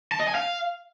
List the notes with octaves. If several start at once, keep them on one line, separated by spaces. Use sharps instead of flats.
A5
D#5
G#5
F5